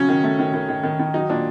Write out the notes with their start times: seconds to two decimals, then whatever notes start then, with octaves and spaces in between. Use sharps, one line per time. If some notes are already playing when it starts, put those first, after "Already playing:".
Already playing: C#3 F#3 C#4
0.09 D#3
0.24 A3
0.39 D#3
0.54 D#3
0.69 D#3
0.83 D#3
0.99 D#3
1.14 F#3 D#4
1.30 A#2 D4